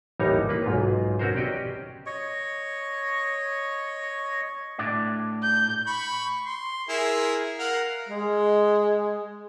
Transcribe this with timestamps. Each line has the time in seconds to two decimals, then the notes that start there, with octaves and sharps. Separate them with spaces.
0.20 A1 D#2 G3 D#4 C#5 A#5
0.49 A#3 B4
0.64 B1 G#2 F4
1.19 C4 C#4 F#4 A#4 C5
1.36 C#4 G4 D5 D#5
2.06 C#5 D#5 C#6
4.78 A2 D4 D5
5.43 G6
5.87 B5 C#6
6.45 C6
6.89 E4 G#4 A#4
7.59 A#4 F5 F#5
8.09 G#3